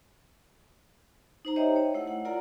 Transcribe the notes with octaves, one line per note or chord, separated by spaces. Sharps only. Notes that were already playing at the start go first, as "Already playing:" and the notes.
D#4 C5 A#5
G4 C5 C#5 D#5 E5 G5
C#5
A3 E4 F#5
F#5
F4 A#4 D5 F#5 A#5